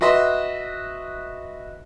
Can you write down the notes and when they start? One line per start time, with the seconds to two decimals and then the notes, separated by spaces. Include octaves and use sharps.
0.01 F#4 B4 D#5 E5 C6